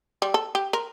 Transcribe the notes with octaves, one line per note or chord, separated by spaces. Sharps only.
G3
A4
G4
A#4